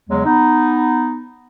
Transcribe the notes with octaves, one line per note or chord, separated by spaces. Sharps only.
E2 C#3 F#3 G#3
B3 D#4